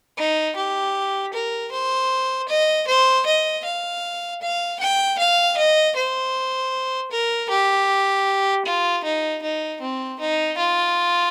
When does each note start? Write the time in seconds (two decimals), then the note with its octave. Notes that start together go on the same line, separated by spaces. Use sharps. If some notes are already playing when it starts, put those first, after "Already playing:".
0.18 D#4
0.56 G4
1.34 A#4
1.72 C5
2.49 D#5
2.88 C5
3.26 D#5
3.65 F5
4.42 F5
4.80 G5
5.19 F5
5.57 D#5
5.96 C5
7.11 A#4
7.50 G4
8.66 F4
9.04 D#4
9.43 D#4
9.81 C4
10.20 D#4
10.58 F4